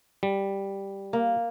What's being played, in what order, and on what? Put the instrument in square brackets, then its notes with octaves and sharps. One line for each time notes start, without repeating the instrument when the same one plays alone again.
[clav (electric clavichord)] G3
[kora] A#3